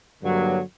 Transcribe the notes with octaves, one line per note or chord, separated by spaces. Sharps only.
G2 D3 F#3 A#3